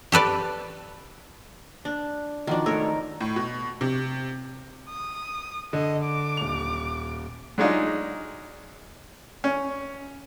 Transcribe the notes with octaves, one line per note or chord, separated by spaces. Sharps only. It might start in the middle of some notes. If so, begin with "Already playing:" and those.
G4 A4 B4 D5
D4
D#3 F3 D4 F#4 D5
G#1 A3 A#4 C#5 E6
A2
B2
C3
D#6
D3 D#5
D6
D#1 F7
F#3 G#3 D4 D#4 F4
C#4